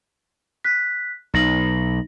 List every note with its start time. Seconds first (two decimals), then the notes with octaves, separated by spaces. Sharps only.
0.64 F#6 B6
1.34 B1 D#4 A#6 F#7